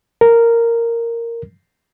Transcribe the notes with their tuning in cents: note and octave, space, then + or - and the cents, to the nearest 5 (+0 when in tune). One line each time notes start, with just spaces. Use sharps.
A#4 -10